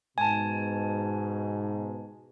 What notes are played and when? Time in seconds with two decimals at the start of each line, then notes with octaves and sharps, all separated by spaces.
0.18 G#2 B2 G#5 A5